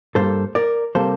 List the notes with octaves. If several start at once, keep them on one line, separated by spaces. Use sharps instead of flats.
G2 D3 G3 A#3 A4 C5
A#4 D5
C3 G3 A#3 A4 C5